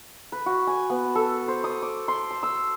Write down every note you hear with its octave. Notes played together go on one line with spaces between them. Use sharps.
B4
F#4
G#5
B3
A4
C5
D#6
D6
C6
A5
E6